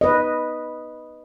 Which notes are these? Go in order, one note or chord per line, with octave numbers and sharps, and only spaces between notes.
B4 D#5